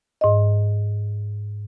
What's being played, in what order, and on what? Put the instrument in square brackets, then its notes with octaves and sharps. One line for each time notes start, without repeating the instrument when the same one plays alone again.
[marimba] G#2 D#5